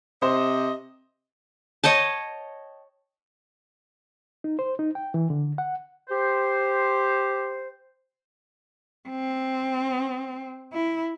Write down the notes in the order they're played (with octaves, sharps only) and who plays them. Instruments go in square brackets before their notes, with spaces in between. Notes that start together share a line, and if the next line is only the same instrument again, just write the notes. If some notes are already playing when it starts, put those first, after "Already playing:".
[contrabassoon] C3 [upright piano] C5 [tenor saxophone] D#5
[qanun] C#5 D#5 G5 A5
[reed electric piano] D#4
C5
D#4
G5
E3
D3
F#5
[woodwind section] G4 C5
[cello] C4
E4